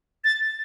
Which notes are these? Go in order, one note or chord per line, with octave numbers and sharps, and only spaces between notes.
A6